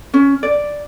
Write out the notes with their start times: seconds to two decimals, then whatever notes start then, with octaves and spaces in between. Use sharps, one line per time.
0.14 C#4
0.43 D5